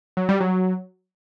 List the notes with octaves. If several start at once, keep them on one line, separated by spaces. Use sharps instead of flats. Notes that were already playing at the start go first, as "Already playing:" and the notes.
F#3
G3
F#3